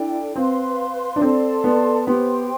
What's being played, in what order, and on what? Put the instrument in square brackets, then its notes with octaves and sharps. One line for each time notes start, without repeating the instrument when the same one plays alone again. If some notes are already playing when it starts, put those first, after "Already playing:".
Already playing: [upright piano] D4 [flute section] E4 A4 D5 G5
[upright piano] C4 [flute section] B4 F5 C6
[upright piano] D4
[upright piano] C4 [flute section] A4 D5 A5 C6
[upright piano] B3
[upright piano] B3 [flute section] G4 C5 G5 C6